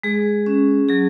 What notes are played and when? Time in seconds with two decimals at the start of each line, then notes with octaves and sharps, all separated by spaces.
0.03 G#3 G#4
0.46 C#4
0.88 F#3 G#4